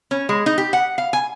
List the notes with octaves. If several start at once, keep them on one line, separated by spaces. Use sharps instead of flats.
C#4
G#3
D#4
G4
F#5
F5
G#5